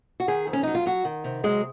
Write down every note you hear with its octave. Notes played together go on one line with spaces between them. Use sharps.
F#4
D#3 G#4
F2
C#4
F#3 D#4
F4
F#3 F#4
D#3
C3
F#3 G#3